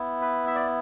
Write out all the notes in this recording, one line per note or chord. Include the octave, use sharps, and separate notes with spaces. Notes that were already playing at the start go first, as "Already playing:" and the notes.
Already playing: B3 E4
B4
E5
D5